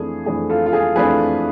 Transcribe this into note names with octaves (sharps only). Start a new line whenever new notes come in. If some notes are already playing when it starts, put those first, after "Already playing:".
Already playing: F2 E3 A3 D4 G#4
F2 E3 A3 D4 G#4
F4 A4
F4
G#4
F2 E3 A3 D4 G#4 B4